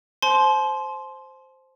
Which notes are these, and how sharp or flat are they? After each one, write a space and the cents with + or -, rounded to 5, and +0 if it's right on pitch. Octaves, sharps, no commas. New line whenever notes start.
C5 +0 A5 -40 C6 +0